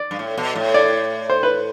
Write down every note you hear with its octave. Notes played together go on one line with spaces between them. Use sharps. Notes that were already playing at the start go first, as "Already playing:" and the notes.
Already playing: D5
G2
A2
B2
A2
D5
C5
B4